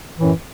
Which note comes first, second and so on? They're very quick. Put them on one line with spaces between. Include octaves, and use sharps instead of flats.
E3 A2 F#2